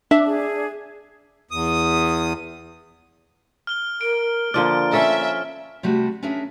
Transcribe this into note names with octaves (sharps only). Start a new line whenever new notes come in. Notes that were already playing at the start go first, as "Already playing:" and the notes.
D4 E5
G#4
E2 D#6
F6 G7
A#4 D7
D3 F3 A#3 D5 F6
C#4 A4 E5
C3 G3 A3 F#4
C#4 D4 G#4 A#4 E5